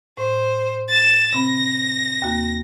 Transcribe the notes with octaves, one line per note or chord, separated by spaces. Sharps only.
A2 C5
A6 E7
C3 C4 B5 A#6
D#2 A#3 F#4